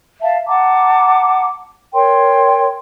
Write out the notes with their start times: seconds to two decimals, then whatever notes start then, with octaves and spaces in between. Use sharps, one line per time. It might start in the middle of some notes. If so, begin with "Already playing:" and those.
0.22 E5 F5 A5
0.47 F#5 A5 A#5 D6
1.94 A#4 C#5 G5 C6